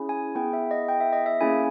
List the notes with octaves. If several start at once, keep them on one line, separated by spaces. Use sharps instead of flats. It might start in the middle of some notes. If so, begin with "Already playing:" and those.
Already playing: C#4 E4 G#4
G#5
B3 E4 G#4 G5
E5
D#5
G5
E5
D#5
E5
A#3 C#4 E4 G#4 G#5